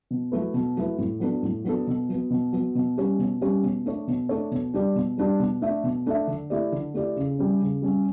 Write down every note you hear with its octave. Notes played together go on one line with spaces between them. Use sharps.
B2
F#3 A3 E4 B4
B2
F#3 A3 E4 B4
A2
F#3 B3 D4 A4
A2
F#3 B3 D4 A4
B2
F#3 B3
B2
F#3 B3
B2
G3 C#4 G4 C#5
B2
G3 C#4 G4 C#5
B2
A3 D4 A4 C#5
B2
A3 D4 A4 C#5
B2
G3 D4 G4 D5
B2
G3 D4 G4 D5
B2
A3 D4 A4 E5
B2
A3 D4 A4 E5
D3
A3 E4 G4 D5
D3
A3 E4 G4 D5
C#3
G3 C#4
C#3
G3 C#4